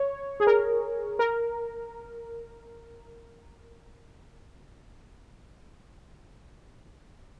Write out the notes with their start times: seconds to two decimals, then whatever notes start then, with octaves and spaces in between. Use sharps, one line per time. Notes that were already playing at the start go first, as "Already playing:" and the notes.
Already playing: C#5
0.40 G#4
0.47 A#4
1.19 A#4